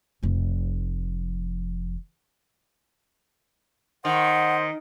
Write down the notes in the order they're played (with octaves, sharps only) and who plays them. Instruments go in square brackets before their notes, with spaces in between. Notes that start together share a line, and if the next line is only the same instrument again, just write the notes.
[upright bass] F1 F3
[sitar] D#3 [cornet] C5 [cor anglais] D#5 [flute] F#5